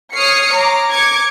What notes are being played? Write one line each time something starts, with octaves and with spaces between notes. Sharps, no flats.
C#5 D#6 F6 C7 C#7
A#5 D6
D6 G#6 C#7